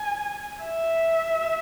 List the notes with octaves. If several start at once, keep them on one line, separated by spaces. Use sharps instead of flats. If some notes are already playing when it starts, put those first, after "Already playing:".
Already playing: G#5
E5